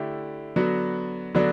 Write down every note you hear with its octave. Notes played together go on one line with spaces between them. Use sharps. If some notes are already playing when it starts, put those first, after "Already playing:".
Already playing: D3 A3 E4 G4
D3 F#3 B3 D4 F#4
D3 F#3 B3 D4 F#4